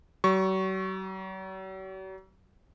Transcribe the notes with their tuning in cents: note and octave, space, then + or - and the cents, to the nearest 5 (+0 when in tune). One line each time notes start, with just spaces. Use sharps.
F#3 +45 C#6 -5